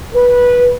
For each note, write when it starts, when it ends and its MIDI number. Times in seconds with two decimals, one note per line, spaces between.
0.14 0.73 71